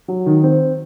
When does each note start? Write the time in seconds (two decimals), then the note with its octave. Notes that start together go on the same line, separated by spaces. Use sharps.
0.08 F#3
0.26 D#3
0.43 C4